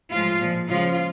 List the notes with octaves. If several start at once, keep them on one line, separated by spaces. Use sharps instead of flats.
A2 F3 G#3 F4
A#2 F3 G#3
C#3 F3 G#3 F4